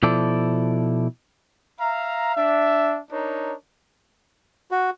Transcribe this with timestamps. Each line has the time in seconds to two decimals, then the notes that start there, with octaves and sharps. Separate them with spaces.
0.03 B2 F3 E4 A4 D5
1.79 E5 F5 A#5
2.35 D4 E5
3.10 D4 D#4 A#4 C#5
4.71 F#4